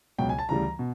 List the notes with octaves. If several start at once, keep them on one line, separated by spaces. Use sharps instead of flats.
C#2 B2 F#3 G5
G#5
A5
D2 C#3 E3 G3 A#5
B2